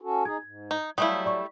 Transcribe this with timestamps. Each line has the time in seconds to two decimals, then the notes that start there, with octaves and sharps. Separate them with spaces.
0.01 C#4 F#4 A4
0.25 D#4 G#4 G#6
0.43 G#2
0.71 D#4
0.98 F#3 G3 A3 E4 F5 D#6
1.26 D5 C#6